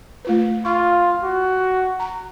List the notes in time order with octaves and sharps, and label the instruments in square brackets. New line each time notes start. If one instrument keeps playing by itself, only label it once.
[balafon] A3 F4 B4
[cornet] F4 [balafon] C#6
[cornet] F#4
[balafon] A#5